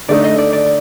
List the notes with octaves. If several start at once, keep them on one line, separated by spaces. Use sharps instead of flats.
D3 A3 D#4 D5
D#5
D5
D5